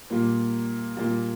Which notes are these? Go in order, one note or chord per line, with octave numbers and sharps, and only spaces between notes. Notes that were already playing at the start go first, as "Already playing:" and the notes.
A#2 G3 A#3 F4
A#2 G3 A#3 F4